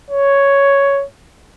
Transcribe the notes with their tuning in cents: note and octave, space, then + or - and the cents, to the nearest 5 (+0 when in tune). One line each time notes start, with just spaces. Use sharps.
C#5 +5